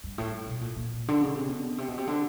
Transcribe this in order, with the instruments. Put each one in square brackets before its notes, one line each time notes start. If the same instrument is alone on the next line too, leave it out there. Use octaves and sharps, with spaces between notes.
[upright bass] G2
A2
B2
A#2
A#2
D3
C#3
C3
B2
C3
B2
C3
D3